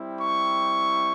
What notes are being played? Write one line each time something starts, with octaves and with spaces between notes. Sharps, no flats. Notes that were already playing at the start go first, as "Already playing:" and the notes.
Already playing: G3 C4 E4
C#6